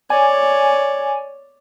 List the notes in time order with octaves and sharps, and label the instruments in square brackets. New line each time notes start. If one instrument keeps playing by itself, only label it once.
[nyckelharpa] C#5 D5 [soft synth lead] G#5